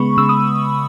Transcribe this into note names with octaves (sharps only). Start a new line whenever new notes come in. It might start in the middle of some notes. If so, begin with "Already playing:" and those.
Already playing: C#3 G#3 B3 B5 C#6
C#3 E6
D#6